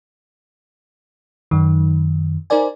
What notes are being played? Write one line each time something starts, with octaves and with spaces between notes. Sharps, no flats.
F#2 D#3
D#4 A#4 C5 D5 G#5